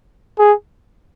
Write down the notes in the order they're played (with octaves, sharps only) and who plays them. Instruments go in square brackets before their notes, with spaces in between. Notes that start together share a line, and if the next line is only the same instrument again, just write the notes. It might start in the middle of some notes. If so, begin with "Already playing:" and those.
[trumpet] G#4